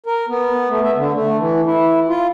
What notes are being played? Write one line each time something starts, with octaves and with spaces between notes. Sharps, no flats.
A#4
B3
A3
E5
D3
A3
E3
E4
F4